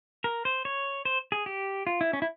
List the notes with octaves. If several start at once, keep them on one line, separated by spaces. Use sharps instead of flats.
A#4
C5
C#5
C5
G#4
G4
F4
E4
C#4
E4